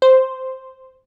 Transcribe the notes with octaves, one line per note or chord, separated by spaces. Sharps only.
C5